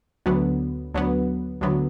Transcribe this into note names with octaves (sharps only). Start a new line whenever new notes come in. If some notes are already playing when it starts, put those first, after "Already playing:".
D2 D3 F#3 B3
D2 D3 F#3 B3
D2 D3 F#3 B3